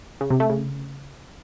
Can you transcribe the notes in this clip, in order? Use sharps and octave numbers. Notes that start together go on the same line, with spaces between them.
C#3
C3
A3
C#3